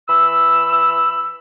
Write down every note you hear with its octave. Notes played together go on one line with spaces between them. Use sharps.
E3 B5 E6